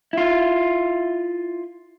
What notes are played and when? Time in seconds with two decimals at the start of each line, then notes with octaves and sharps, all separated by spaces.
0.13 E4 F4